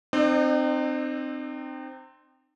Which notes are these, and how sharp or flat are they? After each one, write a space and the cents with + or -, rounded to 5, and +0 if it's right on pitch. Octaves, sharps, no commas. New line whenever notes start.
C4 +0 D#4 -40 D5 +40